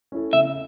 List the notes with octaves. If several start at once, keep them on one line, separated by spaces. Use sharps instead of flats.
C#4 E4 A4
C#3 E5